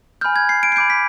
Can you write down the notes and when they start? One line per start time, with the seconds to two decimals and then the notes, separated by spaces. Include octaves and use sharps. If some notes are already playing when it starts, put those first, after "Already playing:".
0.21 G#5 B5 F6 G6
0.36 G#6
0.49 C7
0.63 D7
0.72 C7
0.76 B5 D6 G6 D7
0.90 B6